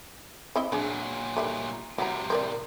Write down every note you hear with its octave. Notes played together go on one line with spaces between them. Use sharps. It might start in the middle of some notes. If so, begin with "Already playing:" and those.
C4 E4 D#5
A#2 F#3 D4 G#4
D#3 G3 A3
A2 C3 F#3 E4 A#5
C4 A#4 D5